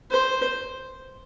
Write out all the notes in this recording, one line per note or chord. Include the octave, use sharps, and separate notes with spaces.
C5